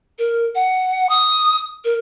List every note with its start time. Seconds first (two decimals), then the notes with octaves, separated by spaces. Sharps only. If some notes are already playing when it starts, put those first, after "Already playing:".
0.19 A#4
0.55 F#5
1.09 D#6
1.85 A#4